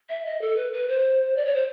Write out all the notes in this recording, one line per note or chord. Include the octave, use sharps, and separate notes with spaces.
E5
D#5
A4
B4
B4
C5
D5
C#5
C5